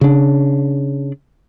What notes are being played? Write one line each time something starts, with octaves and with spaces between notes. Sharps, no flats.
C#3 D4